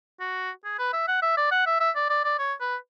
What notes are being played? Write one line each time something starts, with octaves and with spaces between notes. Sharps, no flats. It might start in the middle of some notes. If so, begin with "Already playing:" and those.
F#4
G#4
B4
E5
F#5
E5
D5
F#5
E5
E5
D5
D5
D5
C#5
B4